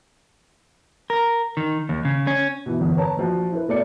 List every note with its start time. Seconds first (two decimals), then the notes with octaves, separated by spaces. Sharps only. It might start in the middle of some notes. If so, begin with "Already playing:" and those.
1.10 A#4
1.57 D#3
1.89 D#2
2.05 C#3
2.27 C#4
2.66 B2 E3
2.79 G1 E2
2.97 B4 C#5 A5 A#5
3.17 A#1 F3 F#4
3.52 E4 B4
3.68 B2 A3 D5 C#7